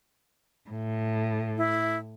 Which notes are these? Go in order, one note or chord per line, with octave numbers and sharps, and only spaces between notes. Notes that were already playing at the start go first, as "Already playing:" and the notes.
A2
E4